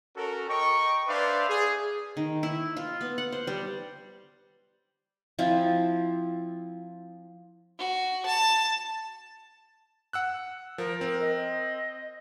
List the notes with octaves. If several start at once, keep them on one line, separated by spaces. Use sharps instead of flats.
C#4 F#4 A4 A#4
D#5 G5 A#5 C#6
D4 B4 C5 D5 E5 F5
G#4
D#3
E4
F4
B3
F#5
C5
G3
F3 C4 E4 F4
F#4
A5
F#5 E6 F#6
F3 A#4
C4
D#5